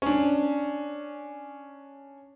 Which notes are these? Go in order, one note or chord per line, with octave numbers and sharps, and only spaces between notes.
C#4 D4